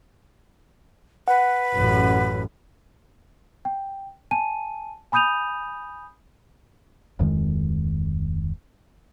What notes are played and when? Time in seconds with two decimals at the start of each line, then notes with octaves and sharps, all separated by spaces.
1.28 B4 F#5
1.74 A1 F#2
3.65 G5
4.31 G#5 A5 D#7
5.12 G#5 B5 D#6 G6 D#7 F7
7.19 D1 F2 D#3 G#3